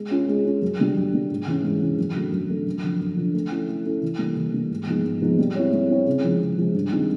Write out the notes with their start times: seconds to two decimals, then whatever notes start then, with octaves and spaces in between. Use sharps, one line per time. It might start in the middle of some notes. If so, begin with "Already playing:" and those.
Already playing: G#3
0.11 C#4 F4
0.29 G#3
0.45 C#4 F4
0.62 F#2
0.79 D3 G3
0.96 F#2
1.13 D3 G3
1.30 G#2
1.47 E3 G#3 C#4
1.63 G#2
1.81 E3 G#3 C#4
1.98 F#2
2.15 D3 F#3 A3
2.32 F#2
2.49 D3 F#3 A3
2.67 F#2
2.83 D3 F3
3.01 F#2
3.17 D3 F3
3.34 A3
3.51 C#4 E4 A4
3.68 A3
3.85 C#4 E4 A4
4.03 E3
4.19 G3 A#3
4.36 E3
4.54 G3 A#3
4.70 G#2
4.87 F3 G#3 B3 D#4
5.05 G#2
5.22 F3 G#3 B3 D#4
5.39 G3
5.55 C4 E4 G#4 C#5
5.73 G3
5.90 C4 E4 G#4 C#5
6.06 C#3
6.24 F3 G#3
6.40 C#3
6.57 F3 G#3
6.74 G2
6.92 D#3 G#3 C4 D#4